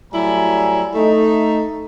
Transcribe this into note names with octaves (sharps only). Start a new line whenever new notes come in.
A2 F#3 G3 E4 G#5 A#5
A3 D#4